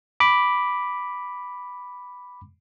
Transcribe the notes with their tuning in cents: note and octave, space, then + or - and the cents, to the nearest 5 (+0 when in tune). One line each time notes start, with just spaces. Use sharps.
B5 +0 D6 +0